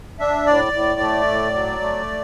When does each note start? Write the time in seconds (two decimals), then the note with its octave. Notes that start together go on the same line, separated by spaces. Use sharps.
0.19 D4 E5
0.46 A2 D5
0.73 A2
1.00 A3
1.28 A2
1.54 F#3
1.81 A3